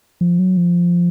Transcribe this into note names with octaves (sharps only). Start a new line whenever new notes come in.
F3
F#3
F3